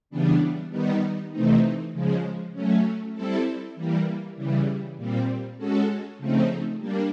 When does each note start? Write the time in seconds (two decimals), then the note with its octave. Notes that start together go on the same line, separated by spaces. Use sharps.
0.10 C#3 E3 G3 B3 D4
0.70 D#3 G3 B3 D#4
1.32 C3 E3 A3 C4 D#4
1.92 C#3 F3 G#3
2.53 F#3 A3 C#4
3.14 G3 C4 E4 A4
3.76 E3 G3 A#3
4.36 C#3 E3 G3
4.97 A#2 G3 C4
5.58 G#3 C#4 F#4 A4
6.19 C#3 F3 A3 C4 D#4
6.79 G3 A#3 D4